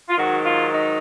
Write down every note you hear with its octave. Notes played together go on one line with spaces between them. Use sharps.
F4
G#2 D#3 F#3 F#4
F4
D#4